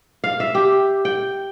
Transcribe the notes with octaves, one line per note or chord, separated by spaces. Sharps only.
F5
E5
G4
G5